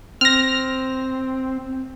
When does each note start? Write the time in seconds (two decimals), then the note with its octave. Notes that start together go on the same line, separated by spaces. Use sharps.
0.21 C4 F6 A#6